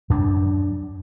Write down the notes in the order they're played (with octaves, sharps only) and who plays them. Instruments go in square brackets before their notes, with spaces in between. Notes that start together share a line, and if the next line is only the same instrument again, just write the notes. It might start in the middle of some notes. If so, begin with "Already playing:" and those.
[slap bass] F#2 D4